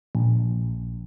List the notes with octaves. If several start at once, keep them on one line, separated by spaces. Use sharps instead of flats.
A#1